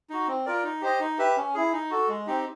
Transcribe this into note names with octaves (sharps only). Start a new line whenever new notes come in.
D#4 F#4
C4
F4 A#4 D5
D#4
G4 C5 D#5
D#4
G4 B4 E5
C#4
E4 G#4
D#4
F#4 A4
G#3
C4 D#4 G4